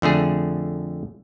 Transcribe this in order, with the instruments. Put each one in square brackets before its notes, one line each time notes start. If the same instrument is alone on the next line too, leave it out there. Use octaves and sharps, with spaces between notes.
[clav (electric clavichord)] F2 D3 A3 G#4